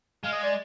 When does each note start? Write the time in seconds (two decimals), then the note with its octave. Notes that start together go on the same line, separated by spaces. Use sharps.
0.24 G#3 F5
0.33 D#5
0.43 D5